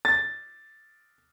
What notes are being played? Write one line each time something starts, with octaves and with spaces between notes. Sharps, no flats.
A6